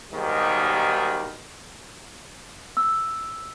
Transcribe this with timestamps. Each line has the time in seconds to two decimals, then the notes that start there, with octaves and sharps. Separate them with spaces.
0.12 D#2 G#2 B2 D#3 G3
2.77 E6